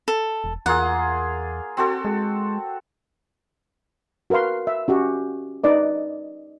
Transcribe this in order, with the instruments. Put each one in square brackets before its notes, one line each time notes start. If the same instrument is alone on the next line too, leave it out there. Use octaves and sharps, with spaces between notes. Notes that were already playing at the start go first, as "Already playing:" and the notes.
[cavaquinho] A4
[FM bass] E1
[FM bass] E2 [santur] A#3 F4 G#4 [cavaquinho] F#5
[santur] C4 F#4 A4
[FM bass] G#3
[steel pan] F#4 A#4 B4 F5 C6
E5
C#4 F#4 G4
D#4 B4 D5 D#5